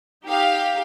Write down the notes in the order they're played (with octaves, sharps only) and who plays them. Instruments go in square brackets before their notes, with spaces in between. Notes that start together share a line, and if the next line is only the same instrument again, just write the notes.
[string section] D#4 G4 F5